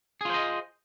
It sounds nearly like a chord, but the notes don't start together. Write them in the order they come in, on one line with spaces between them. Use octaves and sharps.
G#4 F4 C5 D#5